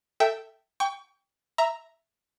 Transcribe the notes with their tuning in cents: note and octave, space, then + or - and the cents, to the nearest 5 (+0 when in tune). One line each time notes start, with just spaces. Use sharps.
A4 +20 E5 +0 G5 -10
G5 +15 C#6 +35
E5 +0 A#5 +0